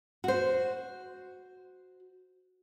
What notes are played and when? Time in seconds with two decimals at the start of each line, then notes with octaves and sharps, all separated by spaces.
0.24 F#4 C5